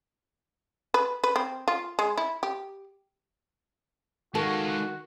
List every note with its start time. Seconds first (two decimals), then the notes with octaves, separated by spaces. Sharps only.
0.94 B4
1.24 B4
1.36 C4
1.68 F4
1.99 G#3
2.18 E4
2.43 G4
4.35 D#3 G#3 F4 F#4 A4